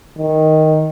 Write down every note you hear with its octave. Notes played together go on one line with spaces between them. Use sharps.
D#3